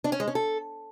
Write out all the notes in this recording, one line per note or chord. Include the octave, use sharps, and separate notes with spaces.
D4
C#4
G#3
C#4
A4